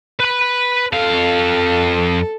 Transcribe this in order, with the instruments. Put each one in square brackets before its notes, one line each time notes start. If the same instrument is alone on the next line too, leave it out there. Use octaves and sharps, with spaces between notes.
[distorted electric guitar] B4 B5
[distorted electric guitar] F2 F5 [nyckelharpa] A4